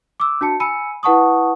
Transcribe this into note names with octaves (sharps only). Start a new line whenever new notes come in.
D6 E6
D4 F#4 A5 C#7
G#5 B5 E6 C#7 D#7
E4 B4 F#5 A5 C#6 D#6